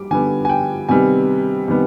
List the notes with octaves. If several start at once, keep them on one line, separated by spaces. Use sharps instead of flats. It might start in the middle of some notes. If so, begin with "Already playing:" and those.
Already playing: G3 D6
D3 G3 B3 G#5
G#5
G5
C3 D#3 G3 B3 G#5
C3 D#3 G3 B3